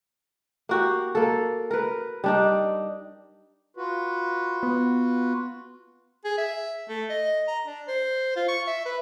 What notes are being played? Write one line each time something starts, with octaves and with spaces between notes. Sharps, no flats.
A#3 F#4 G4
A#3 A4
A#4 B4
G3 D4 D#4
F4 F#4 B4
B3
G#4
E5
A3
D#5
A#5
D4
C5
F4
C#6
E5
B4